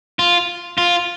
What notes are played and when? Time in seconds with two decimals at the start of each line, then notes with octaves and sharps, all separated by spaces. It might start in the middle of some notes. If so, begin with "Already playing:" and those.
0.19 F4
0.78 F4